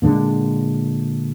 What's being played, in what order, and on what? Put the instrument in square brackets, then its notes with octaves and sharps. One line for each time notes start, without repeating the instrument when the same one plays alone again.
[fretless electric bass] A#2 D3 G#3